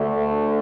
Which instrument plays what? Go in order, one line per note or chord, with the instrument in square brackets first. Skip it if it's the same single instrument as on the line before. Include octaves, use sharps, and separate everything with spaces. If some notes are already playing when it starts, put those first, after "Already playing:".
Already playing: [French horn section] D2 D3 A3